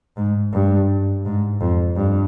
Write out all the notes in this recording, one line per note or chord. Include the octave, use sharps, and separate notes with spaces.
G#2
G2
G#2
F2
G2